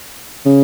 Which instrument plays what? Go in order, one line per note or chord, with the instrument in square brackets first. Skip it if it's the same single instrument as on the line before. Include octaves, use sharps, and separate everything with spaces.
[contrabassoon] C#3